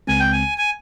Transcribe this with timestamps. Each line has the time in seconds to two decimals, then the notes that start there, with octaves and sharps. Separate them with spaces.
0.07 C#2 C#3 G#3 C4 G#5
0.20 G5
0.33 G#5
0.58 G#5